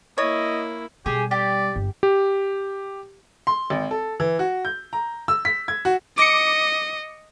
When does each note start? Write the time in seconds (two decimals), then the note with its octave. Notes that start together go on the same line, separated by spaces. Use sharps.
0.18 A#3 E4 C#5 D#5
1.06 B2 G3 G4 G#4
1.31 G4 D5
1.76 G1
2.03 G4
3.47 C6
3.70 G#1
3.91 A4
4.20 E3
4.39 F#4
4.65 G6
4.93 A#5
5.28 E6
5.45 B6
5.68 G#6
5.85 F#4
6.18 D#5 D6 C#7